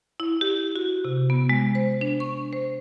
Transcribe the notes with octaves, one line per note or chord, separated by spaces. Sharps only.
E4
G4
F#4
C3
B3
G#3
C5
D4
C#6
C5